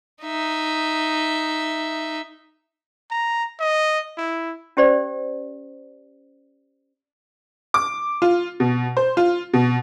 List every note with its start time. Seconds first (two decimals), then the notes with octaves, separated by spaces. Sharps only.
0.23 D#4 E5
3.11 A#5
3.60 D#5
4.18 E4
4.77 C#4 G4 C5 D5
7.74 D6
8.22 F4
8.60 B2
8.97 C5
9.17 F4
9.54 B2